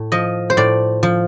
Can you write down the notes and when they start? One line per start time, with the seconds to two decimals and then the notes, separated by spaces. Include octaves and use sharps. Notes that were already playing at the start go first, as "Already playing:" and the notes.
Already playing: A2
0.12 F3 D#5
0.50 C5
0.57 A2 D5
1.03 F3